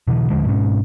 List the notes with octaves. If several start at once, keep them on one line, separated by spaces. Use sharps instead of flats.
B2 D3 E3
D#2 D3 F3 G#3
G#2 B2 G#3 C#4